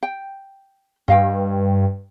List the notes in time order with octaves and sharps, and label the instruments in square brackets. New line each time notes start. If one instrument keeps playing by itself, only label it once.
[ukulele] G5
[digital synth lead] G2 [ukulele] D#5 F5 G5